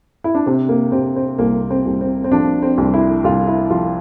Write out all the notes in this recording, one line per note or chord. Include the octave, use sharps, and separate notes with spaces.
E4
D4
C3 C4
A#3
C3 C4
C4
C2 A#3
C4
C2
C4
C4
F3 D4
C4
C2
E4
C2 F4
E4
F3 F4